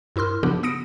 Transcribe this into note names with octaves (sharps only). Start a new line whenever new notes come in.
G2 E4 A#4 C6 F6
C#3 F3 B3 D4 F#4 G4
B3 D#6 A#6 C#7 D7